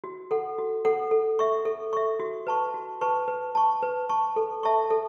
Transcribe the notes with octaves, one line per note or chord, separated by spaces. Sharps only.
F#4
A4 F#5
F#4
A4 F#5
A4
E5 C#6
A4
E5 C#6
F#4
B4 A5 C#6
F#4
B4 A5 C#6
B4
A5 C#6
B4
A5 C#6
A4
E5 A5 C#6
A4